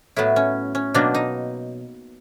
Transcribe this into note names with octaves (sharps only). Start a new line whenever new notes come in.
A2 F#3 B3 E4
C#4
C#4
B2 F#3 A#3 D4
D#4